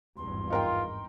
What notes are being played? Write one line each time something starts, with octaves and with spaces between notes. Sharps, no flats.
G#1 E2 G2 C6
D#4 F4 A#4 G5